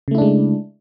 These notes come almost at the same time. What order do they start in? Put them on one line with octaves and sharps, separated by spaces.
C#3 A3 E4 D4 G#3